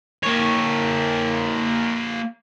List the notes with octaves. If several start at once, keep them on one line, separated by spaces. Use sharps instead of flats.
A#3 C#5